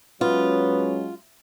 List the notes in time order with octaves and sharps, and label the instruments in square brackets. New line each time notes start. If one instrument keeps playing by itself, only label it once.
[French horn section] F#3 G#3 C#4 [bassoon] B3 [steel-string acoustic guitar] F4